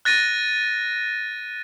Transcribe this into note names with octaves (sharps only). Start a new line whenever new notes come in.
F#6 A6 A#6 D#7